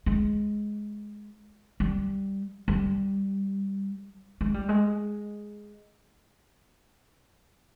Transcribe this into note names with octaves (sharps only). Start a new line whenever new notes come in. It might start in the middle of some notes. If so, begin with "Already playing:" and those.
G#3
G3
G3
G#3
G3
G#3